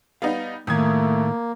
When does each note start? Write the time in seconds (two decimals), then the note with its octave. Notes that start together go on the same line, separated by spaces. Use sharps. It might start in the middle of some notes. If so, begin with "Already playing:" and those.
0.22 G3 B3 D#4 F5
0.67 F2 A2 D#3 A3 A#3 D#6 G#6